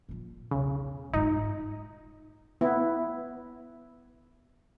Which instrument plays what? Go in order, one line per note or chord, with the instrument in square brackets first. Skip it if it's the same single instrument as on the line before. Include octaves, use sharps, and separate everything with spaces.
[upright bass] A#2 F3
[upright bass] B1 E2 [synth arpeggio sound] C#3
[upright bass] G#2 F4 [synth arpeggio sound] D#4
[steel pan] B3 E4